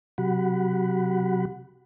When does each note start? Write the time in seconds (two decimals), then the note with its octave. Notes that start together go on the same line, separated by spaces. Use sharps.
0.18 C3 F#3 F#4 G4 F#5 B5